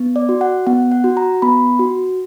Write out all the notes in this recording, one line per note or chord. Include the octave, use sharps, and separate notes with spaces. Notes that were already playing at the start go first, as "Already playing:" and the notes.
Already playing: B3
D5
F#4
F#5
B3 F#5
F#5
F#4
A#5
B3 B5
F#4